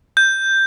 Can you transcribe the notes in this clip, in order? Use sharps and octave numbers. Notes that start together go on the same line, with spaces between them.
G6